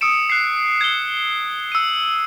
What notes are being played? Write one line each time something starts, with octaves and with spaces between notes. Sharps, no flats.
D#6 E6 C#7 D7 E7
F#6 C7
G#6 G7
E6 D#7